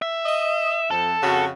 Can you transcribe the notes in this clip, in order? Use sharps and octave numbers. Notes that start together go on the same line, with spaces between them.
E5
D#5
F2 A4
F2 C#3 F#4